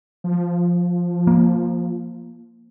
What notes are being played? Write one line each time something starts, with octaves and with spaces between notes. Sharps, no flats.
F3
A#3